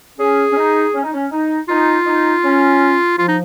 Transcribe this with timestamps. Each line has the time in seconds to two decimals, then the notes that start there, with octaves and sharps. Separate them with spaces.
0.19 C#4 G#4
0.52 C#4
0.57 D#4
0.94 C#4
1.03 D#4
1.13 C#4
1.32 D#4
1.68 D#4 F4
2.06 D#4
2.44 C#4
3.18 F3 F4
3.28 D#4